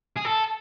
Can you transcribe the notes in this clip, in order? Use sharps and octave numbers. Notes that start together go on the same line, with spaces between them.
G#4
A4